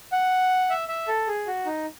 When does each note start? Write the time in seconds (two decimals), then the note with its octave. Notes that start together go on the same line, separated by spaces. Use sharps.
0.12 F#5
0.70 E5
0.88 E5
1.08 A4
1.27 G#4
1.47 F#4
1.66 D#4